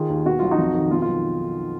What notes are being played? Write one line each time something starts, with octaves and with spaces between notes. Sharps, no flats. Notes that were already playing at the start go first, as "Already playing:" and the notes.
Already playing: D#3 F4 G#4
D#2
B2 F#4
B1 F4
D#4 F#4
F2
D#3
B2 F4
F4
B1